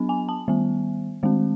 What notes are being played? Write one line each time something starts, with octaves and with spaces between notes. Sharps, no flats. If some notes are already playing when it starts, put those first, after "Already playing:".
Already playing: F#3 B3 D4
G#5
A5
D#3 G3 B3
D#3 G#3 C4